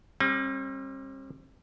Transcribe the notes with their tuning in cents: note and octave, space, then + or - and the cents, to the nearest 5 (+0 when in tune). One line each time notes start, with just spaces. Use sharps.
G3 +25 C4 +45